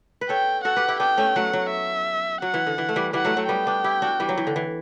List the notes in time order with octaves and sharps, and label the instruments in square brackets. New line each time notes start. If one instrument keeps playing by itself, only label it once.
[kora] B4
[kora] A4 C#5 [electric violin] G5
[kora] F#4 A4 [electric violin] F#5
[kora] G4 B4
E4 G4
[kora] B3 D4 [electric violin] G5
[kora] A3 C#4
[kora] F#3 A3 [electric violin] F#5
[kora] F#3
[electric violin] E5
[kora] F#3 [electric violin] F#5
[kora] E3
D3
E3
A3
E3 G3
[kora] E3 G3 [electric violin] F#5
[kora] F#3 A3
F#3 A3
[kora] G3 B3 [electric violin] G5
[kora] B3 D4
E4 G4
D4 F#4
E3 G3
F#3
E3
D3
E3